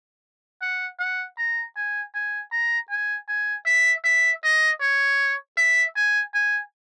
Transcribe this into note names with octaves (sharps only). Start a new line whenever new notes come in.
F#5
F#5
A#5
G#5
G#5
A#5
G#5
G#5
E5
E5
D#5
C#5
E5
G#5
G#5